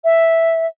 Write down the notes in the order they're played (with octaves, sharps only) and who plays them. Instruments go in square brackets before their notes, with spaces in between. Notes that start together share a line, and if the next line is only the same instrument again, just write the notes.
[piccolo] E5